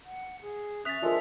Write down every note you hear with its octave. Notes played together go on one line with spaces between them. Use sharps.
F#5
G#4
C#4 E5 D#6 F#6 A6 B6 F7
F3 G#3 D4 F4 A4 A#4